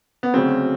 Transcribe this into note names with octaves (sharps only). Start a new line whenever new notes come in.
B3
D2 C#3 F#3 C4